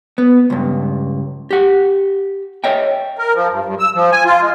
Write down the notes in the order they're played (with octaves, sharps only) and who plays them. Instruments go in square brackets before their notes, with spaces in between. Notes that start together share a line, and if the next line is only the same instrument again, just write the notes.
[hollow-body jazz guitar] B3
C#2 G2
G4 F#5
C#5 D#5 E5 G5
[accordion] A#4
F3
G2
G2
E6
F3
G#5
F4
G#3